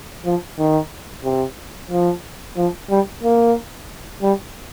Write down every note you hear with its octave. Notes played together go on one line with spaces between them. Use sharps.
F3
D#3
C3
F3
F3
G3
A#3
G3